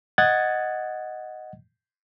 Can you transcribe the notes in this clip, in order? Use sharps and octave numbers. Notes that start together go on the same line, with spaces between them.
D#5 F#5 G#6 A6